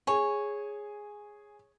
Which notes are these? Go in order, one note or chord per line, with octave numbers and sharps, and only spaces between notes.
G#4 C#5 G#5